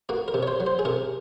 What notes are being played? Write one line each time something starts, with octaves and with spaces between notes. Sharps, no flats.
A#3 F#4
A#4
C3
C#5
C5
F#3
C5
G#4
C3 A#4